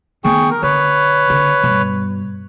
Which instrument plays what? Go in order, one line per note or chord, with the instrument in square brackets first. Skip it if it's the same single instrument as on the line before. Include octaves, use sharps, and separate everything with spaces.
[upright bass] D#3 B3 [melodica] G#4 G5 C#6
[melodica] A#4
[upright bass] D3 [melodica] B4 C#5
[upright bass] D3
G2 B2